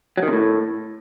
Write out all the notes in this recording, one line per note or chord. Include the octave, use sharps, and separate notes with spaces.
F#3
D#3
C3
A2